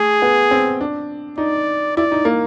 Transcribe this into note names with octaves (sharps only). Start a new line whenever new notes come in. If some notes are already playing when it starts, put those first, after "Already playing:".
Already playing: A3 G#4
B3
C4
D4
D#4 D5
E4 D5
D#4
A#3